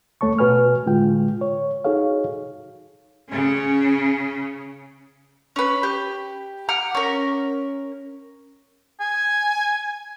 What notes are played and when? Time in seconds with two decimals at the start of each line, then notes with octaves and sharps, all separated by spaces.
0.21 D2 A3 C#5 A5 C#6
0.39 B2 F#4 B4 G#5 F6
0.86 A2 D3 G#3 F4 G5
1.41 C#5
1.84 D#4 F#4 G#4 A4 C#5 F5
3.29 C#3 C#4
5.56 C#4 B4
5.83 G4
6.69 G4 F#5 A#5 F6
6.95 C#4 A#4
9.00 G#5